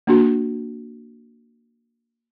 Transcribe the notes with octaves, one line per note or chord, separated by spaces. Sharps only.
A#3 D4 F#4